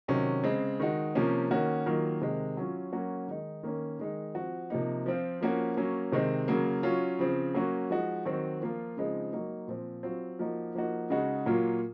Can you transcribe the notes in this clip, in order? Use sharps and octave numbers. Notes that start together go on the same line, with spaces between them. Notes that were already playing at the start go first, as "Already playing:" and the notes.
C3 D#3 F#3 C#4
C#3 G#3 C4
D#3 G#3 D#4 F#4
C3 F3 A#3 C#4
D#3 A#3 C#4 F#4
D#3 F#3 A#3 F4
C3 D#3 G#3
F#3 C#4 F4
F#3 A#3 C#4 F#4
D#3 G#3 D#4
D#3 A#3 C#4
D#3 G#3 D#4
F3 C4 F#4
C3 F3 A#3 D#4
F3 C4 F4
F3 A#3 C#4 F#4
F#3 A#3 C#4
C3 D#3 G#3 C4
C#3 F#3 A#3
F#3 C#4 F4
C#3 F3 C4
F#3 A#3 C#4 F#4
F3 G#3 D#4 F#4
D#3 F#3 C4 F#4
F3 A#3 F4
C#3 F3 G#3 C4 D#4
F#3 A#3 D#4
A#2 F3 C4
F#3 C4 F4
F3 A#3 D#4 F#4
F3 A#3 D#4 F#4
C#3 G#3 D#4 F#4
A#2 F#3 A#3 F4